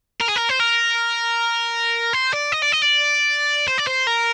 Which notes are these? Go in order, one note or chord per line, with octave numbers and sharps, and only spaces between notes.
A#4
G#4
A#4
C5
A#4
C5
D5
D#5
D5
D#5
D5
C5
D5
C5
A#4